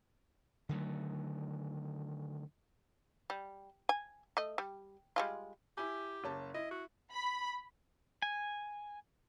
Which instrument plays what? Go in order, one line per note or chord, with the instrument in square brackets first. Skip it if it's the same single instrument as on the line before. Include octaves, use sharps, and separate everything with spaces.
[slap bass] D3 D#3 F#3 A3
[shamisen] G3
G#5
A3 D#5
G3
G3 G#3 F4
[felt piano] E4 G#5 [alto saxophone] G4
[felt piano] F#1 C#4 A5
[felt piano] E4 [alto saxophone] D#5
[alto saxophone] F#4
[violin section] B5
[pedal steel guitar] G#5